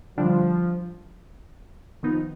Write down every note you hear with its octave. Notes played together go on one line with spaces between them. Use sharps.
D3 F3 G3 D4
D#3 F3 B3 D#4